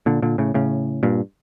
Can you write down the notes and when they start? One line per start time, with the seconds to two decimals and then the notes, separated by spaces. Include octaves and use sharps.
0.06 A#2 D3
0.22 A#2 D3
0.38 A2 C#3
0.54 A2 C#3
1.03 G2 A#2